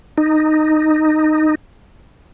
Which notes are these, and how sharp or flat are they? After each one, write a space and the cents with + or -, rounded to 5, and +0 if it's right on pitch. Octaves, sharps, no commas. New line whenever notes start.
D#4 -10